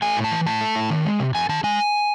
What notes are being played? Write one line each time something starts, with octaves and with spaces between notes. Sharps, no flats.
A3 G#5
A2
A5
E3
A2 A5
A3
A2
D#3
G#3
C3
F2 G#5
D#3 A5
G#3 G#5